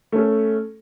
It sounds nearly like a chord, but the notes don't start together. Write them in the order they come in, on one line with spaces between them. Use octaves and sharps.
A3 C#4 A4